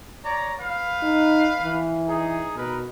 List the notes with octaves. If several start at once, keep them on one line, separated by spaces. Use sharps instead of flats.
C#5 D5 A#5
B4 F5
D#4
E3
D#4 G#4
B2 D#4 A#4 B4